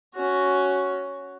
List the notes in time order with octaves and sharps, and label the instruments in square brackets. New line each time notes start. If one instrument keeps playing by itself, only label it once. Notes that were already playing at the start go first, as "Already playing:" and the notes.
[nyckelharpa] C#4 F#4